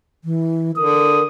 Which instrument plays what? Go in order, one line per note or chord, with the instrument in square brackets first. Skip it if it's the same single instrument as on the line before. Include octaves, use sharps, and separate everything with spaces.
[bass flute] E3
[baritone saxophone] D3 [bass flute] A#4 [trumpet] D#6